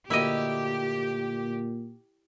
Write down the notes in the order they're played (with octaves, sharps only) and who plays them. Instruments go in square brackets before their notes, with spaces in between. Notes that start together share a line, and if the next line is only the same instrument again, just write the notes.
[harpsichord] D2 A#3 D#6 [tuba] A#2 [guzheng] E4 D#5 [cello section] G4